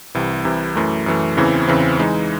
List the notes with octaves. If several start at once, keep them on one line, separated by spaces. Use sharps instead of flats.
C2 C3 E3
C2 C3 E3
F#2 E3 A3
F#2 E3 A3
E2 C#3 E3 C4
E2 C#3 E3 C4
E3 G#3 D#4